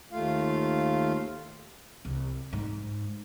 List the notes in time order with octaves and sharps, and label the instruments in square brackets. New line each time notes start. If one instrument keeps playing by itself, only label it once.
[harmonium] D#2 A3 F4 F5
[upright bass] C2
G#2